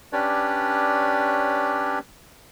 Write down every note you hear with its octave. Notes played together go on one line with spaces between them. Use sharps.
C#4 D4 G4 B4 C#5 D5